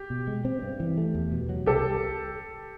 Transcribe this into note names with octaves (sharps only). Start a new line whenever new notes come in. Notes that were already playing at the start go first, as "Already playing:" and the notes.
Already playing: G4
B2
G#3
C4
G2
E3
A3
E2
B2
F#3
C2 G4 A4